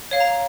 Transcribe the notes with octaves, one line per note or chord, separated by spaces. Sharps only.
C#5 F5
A#5